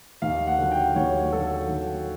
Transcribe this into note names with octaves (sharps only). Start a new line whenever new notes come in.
D#2 F5
F#5
D3 F#3
G5
D#2 C#5
D3 F#3 A4
D#2